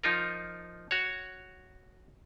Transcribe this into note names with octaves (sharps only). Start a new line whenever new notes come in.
F3 D#4 F4 A#4
F#4 C#5